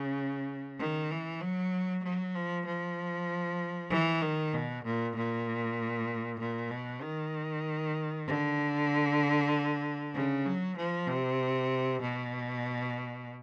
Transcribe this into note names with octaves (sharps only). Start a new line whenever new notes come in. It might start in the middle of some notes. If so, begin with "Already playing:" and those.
Already playing: C#3
D#3
E3
F#3
F#3
F3
F3
E3
D#3
B2
A#2
A#2
A#2
B2
D#3
D3
C#3
F#3
F3
C3
B2